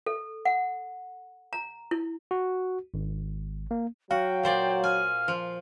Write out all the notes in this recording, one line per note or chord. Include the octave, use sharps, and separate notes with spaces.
A4
F#5
A#5
E4
F#4
G#1
A#3
F#3 F#4 F5 G5
A#2 C5 D5
G#5 F6
F3